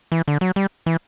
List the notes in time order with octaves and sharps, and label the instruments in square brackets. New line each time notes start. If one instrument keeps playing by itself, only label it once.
[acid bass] E3
D3
F#3
G3
E3